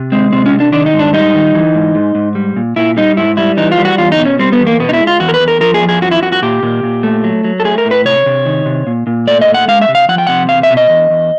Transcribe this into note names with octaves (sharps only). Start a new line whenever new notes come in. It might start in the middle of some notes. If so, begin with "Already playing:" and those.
Already playing: C3
G#3 C4
C3 C4
C#4
C3
D4
D#3 D4
D#4
G#2
D4
G3 D#4
D#3
E3
G#2
G#2
G#2
G3
A#2
A#2 E4
G3 D#4
G#2 E4
G3 E4
E3 D#4
F4
G3
F#4
E2 F4
D#4
B2
C#4
G3 C4
B3
E2
A#3
B2 B3
D#4
E4
G#3
F4
E2 F#4
A#4
B4
E2
A#4
F3 A#4
G#4
F2
G#4
F3 F#4
E4
F2 F#4
F#4
A#2 G4
A#2
A#2
A3
F#3
F#3
A4
A3 G#4
A#4
A2
B4
C3 C#5
C3
D#3
C3
A#2
A#2
A3 D5
D#5
A#2
F#5
G#3 F5
E5
C3
F5
F3 F#5
G5
C3 F#5
E2 F5
E5
B2
D#5
E2
E2